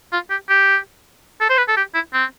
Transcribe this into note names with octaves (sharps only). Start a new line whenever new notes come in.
F4
G4
G4
A4
C5
B4
A4
G4
E4
C4